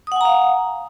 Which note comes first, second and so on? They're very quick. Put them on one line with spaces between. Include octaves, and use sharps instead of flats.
D#6 F#5 G#5 A#5 F5